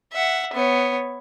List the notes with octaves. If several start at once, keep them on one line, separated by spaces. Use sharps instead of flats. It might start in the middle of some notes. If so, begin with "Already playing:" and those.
E5 F#5
B3 C#5